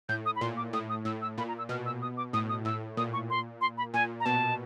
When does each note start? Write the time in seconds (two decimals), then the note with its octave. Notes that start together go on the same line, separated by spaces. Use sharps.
0.09 A2 G6
0.26 D#6
0.36 B5
0.41 A#2 C6
0.57 D6
0.73 A2 D#6
0.89 D#6
1.05 A2 E6
1.22 E6
1.38 A#2 B5
1.48 A#5
1.58 E6
1.69 B2 F6
1.86 E6
2.02 D#6
2.17 D6
2.33 A2 D#6
2.49 D#6
2.65 A2 E6
2.97 A#2 D#6
3.13 C#6
3.30 C6
3.61 C6
3.77 B5
3.94 A#2 G#5
4.20 A#5
4.25 B2 A5